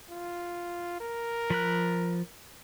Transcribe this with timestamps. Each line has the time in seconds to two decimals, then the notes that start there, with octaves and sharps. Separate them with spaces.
0.11 F4
1.01 A#4
1.50 F3 B5 F#6